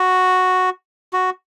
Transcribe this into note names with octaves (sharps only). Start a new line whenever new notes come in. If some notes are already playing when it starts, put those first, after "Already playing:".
Already playing: F#4
F#4